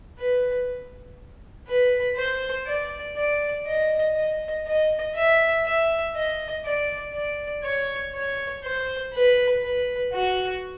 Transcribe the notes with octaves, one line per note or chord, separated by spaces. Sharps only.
B4
B4
C5
D5
D5
D#5
D#5
D#5
E5
E5
D#5
D5
D5
C#5
C#5
C5
B4
B4
F#4